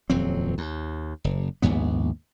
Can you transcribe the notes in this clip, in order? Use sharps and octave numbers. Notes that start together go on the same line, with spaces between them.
D#1 F2 F#3 C4
D#2
F#1
A#1 D#2 G#2 B3